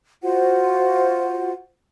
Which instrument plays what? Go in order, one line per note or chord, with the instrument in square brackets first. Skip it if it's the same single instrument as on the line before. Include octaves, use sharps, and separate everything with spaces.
[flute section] F4 F#4 C5 F#5